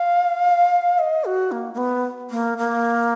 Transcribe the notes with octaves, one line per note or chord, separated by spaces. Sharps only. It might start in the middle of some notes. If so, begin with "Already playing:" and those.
Already playing: F5
D#5
F#4
A#3
A#3
B3
A#3
A#3